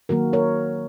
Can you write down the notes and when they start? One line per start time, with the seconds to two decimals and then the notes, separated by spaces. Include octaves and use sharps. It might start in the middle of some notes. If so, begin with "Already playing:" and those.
0.09 D#3 F#3 A#3 F#4 A#4
0.33 A#4 C#5